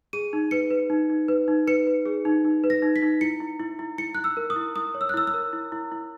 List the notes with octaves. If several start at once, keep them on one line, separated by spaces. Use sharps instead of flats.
G#4 D#7
D#4
B4 C#7
B4
D#4
D#4
B4
D#4
B4 C#7
B4
G#4
D#4
D#4
B4
A#6
D#4
B6
D#4
E4 C#7
E4
E4
E4
E4 C#7
E4 F#6
E6
A#4
D#6
E4
E4 D#6
C#5
E6
F#6
E4 E6
E6
A#4
E4
E4
E4